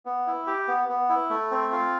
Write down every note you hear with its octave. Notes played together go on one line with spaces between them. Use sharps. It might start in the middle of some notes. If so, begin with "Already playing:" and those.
B3
E4
G4
B3
B3
E4
A3
C4
F4